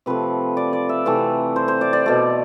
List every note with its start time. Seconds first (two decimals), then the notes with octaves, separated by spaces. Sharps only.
0.06 C3 F3 A3 B4
0.57 D5
0.73 D5
0.89 E5
1.06 C3 E3 A3
1.56 C5
1.68 C5
1.81 D5
1.93 D5
2.06 B2 A3